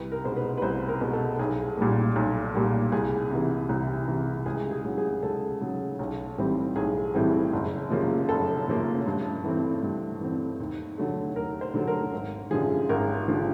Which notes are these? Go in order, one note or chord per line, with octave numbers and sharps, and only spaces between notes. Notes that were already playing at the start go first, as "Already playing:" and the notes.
Already playing: C2 B4
A#4
B2 G#3 B3 C5
B4
B4
C2 C5
A#4
B2 G#3 B3
A4
B1 G#4
A#2 G3 A#3
B1
A#2 G3 A#3
C2 G#4
C3 E3
C2
C3 E3
C#2 G#4
G#4
C#3 F#3
G#4
C#2 A4
C#3 F#3
B1
A2 E3 G3 C4
B1 G#4
A2 E3 G3 C4
F#1
F#2 C#3 F3 A#3
F#1 A4
F#2 C#3 F3 A#3
G2
E3 A3 C4
G2
E3 A3 C4
D#2
D3 F#3 A3
D#2 A#4
C5
D3 F#3 A3
A#4
G#1
F#2 D3 F3 G#4
G#1 A#4
D3 F3